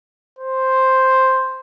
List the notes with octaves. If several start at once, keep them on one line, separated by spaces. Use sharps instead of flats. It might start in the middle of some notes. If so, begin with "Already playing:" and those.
C5